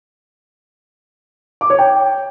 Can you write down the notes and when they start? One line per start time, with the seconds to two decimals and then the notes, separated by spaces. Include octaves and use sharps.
1.61 D6
1.70 C#5
1.79 G5